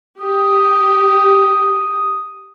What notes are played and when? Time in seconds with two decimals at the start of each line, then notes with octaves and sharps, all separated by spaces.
0.20 G4 D#6